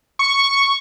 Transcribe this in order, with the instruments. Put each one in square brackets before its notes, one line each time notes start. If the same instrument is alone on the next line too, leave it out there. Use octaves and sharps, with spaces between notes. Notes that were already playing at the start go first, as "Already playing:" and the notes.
[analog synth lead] C#6